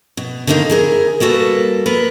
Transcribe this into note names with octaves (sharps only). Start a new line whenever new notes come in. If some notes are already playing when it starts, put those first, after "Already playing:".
B2
D3 D#3 A#3 C#4 D#4
E4 G#4 A#4
G3 A#3 F#4 A4 B4
B3 A#4 B4